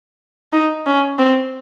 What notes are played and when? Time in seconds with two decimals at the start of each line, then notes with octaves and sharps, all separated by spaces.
0.52 D#4
0.87 C#4
1.19 C4